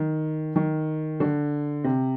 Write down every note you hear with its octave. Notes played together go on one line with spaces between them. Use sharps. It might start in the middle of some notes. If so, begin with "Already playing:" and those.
Already playing: D#3
D#3
D3
C3